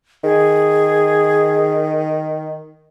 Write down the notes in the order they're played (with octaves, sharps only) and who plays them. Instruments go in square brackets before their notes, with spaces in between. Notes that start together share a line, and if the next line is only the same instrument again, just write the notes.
[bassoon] D#3 [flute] G#4